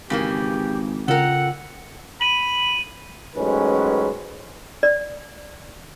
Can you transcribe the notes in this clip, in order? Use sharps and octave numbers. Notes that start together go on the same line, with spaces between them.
G#1 C#3 E3 A#3 G4
C#3 F4 A4 A#4 F#5 G5
B5 D#7 F#7
A1 G#2 F#3 G#3 C#4 B4
D5